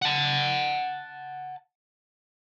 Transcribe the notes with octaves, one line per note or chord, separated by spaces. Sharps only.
F#5 A5